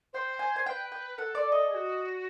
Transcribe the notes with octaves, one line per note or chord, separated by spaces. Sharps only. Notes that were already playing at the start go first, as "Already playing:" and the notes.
C5 G5
G#5
G#5
B4 C5 G5
G5
A4 F#5
D5
D#5
G#4
F#4